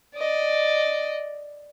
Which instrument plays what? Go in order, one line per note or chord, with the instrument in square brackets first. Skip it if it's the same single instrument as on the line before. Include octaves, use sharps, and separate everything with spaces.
[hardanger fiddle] D5 D#5